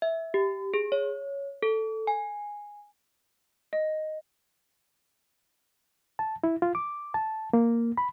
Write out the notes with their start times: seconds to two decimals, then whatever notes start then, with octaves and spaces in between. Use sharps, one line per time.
0.02 E5
0.34 G4
0.74 G#4
0.92 C#5
1.62 A4
2.07 G#5
3.73 D#5
6.19 A5
6.44 E4
6.62 F4
6.75 D6
7.14 A5
7.53 A#3
7.97 B5